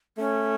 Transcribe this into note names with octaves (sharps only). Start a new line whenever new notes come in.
A3 C#4